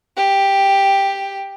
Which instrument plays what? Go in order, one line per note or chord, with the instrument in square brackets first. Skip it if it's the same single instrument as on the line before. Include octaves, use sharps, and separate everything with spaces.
[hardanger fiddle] G4